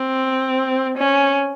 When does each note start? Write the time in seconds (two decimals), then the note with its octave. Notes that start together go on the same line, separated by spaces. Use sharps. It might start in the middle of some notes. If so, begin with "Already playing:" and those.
Already playing: C4
0.98 C#4